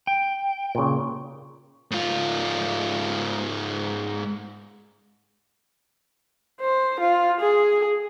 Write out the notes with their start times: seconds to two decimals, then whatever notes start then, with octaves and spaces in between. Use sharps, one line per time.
0.07 G5
0.75 A#2 C#3
1.91 G#2 F4
6.61 C5
7.00 F4
7.40 G#4